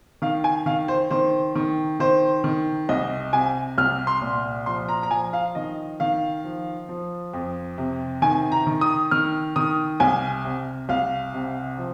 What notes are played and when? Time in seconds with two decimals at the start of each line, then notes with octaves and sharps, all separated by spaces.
0.22 D#3 F5
0.44 G#5
0.66 D#3 F5
0.88 C5
1.10 D#3 C5
1.55 D#3
2.00 D#3 C5
2.44 D#3
2.89 C2 D#5
3.33 C3 G#5
3.78 C2 F6
4.07 C6
4.22 A#2
4.66 F3 C6
4.88 A#5
5.03 A#5
5.11 F3 G#5
5.33 F5
5.55 D#3 D#5
6.00 D#3 F5
6.44 F3
6.89 F3
7.34 F2
7.78 C3
8.22 D#3 G#5
8.52 A#5
8.67 D#3
8.81 D#6
9.11 D#3 F6
9.56 D#3 D#6
10.00 C2 G#5
10.44 C3
10.89 C2 F5
11.34 C3
11.78 F3